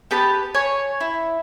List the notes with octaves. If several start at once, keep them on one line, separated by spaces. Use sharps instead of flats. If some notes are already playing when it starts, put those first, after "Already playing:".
B3 G4 B4 A5
C#5 G#5
E4